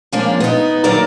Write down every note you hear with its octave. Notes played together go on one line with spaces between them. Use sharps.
F3 G#3 A#3 C#4 D4
B3 D#4
D#3 F#3 A#3 A#4 D5